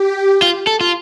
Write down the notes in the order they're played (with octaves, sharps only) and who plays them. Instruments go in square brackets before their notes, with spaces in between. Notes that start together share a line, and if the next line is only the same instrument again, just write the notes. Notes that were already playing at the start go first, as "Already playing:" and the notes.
Already playing: [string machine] G4
[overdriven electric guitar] F4
A4
F4